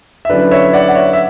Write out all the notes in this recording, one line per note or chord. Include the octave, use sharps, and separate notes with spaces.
E5
D3 F#3 C#4 E4 B4 D5
C#5 E5
D5 F#5
F#5
C#5 E5
E5